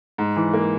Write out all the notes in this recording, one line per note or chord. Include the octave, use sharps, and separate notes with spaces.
G#2
E3
A#3